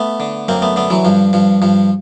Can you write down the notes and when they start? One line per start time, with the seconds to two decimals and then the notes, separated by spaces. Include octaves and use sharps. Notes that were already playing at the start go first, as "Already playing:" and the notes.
Already playing: A3 B3
0.20 D3
0.48 F#2 A#3 C4
0.62 A3 B3
0.76 D3 A3 B3
0.90 E3 F#3
1.05 G2 F3
1.33 G2 F3
1.62 G2 F3